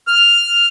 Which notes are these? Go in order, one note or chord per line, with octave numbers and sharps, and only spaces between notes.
F6